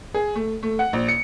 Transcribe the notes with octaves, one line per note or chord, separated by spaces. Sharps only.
G#4
A3
A3
F#5
A#1
C#7